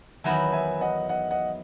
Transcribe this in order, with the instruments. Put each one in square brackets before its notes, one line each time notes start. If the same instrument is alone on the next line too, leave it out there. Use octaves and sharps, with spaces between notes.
[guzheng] E2 D#3 F#3 B3 E4 [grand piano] E5 G#5
[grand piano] E5 G#5
D#5 F#5
D#5 F#5
D#5 F#5